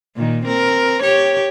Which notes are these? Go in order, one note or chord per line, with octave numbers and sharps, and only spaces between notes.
A#2 D#3
C4 A#4
G4 C#5